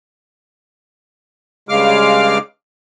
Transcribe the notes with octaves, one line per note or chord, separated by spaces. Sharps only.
G2 C#3 G#3 F5 D6 F6